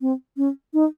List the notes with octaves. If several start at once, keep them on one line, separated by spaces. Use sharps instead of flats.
C4
C#4
D#4